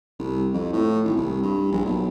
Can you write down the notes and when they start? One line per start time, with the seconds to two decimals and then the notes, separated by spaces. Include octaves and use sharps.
0.19 C2
0.53 F2
0.73 A2
1.04 G#1
1.17 C2
1.43 G2
1.72 A#1
1.85 B1